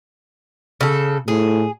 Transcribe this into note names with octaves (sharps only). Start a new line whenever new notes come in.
C#3 A4
A2 G#4